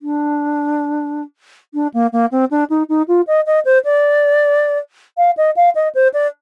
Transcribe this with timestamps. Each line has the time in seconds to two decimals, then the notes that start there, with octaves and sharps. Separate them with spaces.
0.02 D4
1.74 D4
1.93 A#3
2.12 A#3
2.31 C4
2.51 D4
2.69 D#4
2.89 D#4
3.08 F4
3.27 D#5
3.46 D#5
3.65 C5
3.84 D5
5.18 F5
5.37 D#5
5.56 F5
5.75 D#5
5.94 C5
6.13 D5